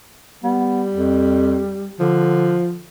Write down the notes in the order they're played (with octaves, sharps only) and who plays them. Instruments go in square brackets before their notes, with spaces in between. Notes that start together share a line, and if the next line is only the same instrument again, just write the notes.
[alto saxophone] G3 [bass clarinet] B3
[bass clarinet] F2
[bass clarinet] D3 [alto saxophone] F3